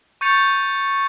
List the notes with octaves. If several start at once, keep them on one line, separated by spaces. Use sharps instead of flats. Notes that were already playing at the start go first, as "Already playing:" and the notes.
C#6 G6 A6 C#7 F7